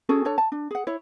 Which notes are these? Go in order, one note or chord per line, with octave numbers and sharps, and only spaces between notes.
C#4 F#4 G#4 A4
D4 A4 C#5 A5
A5
D4
G#4 F#5
E4 C#5